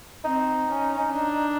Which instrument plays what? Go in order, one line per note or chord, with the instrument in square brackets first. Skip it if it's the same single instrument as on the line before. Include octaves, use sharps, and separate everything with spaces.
[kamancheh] C4 [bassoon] D#4
[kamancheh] C#4
D4